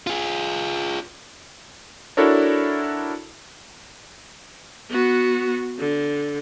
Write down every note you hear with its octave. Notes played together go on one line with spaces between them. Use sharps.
F4 G#4
D4 E4 F#4 A4 A#4 C#5
B3 F#4
D3